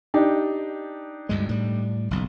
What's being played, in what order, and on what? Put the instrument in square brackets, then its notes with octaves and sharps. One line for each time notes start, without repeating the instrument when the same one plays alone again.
[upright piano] D4 D#4 G4
[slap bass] D2 G2 G#3
A2 G3
F#1 B1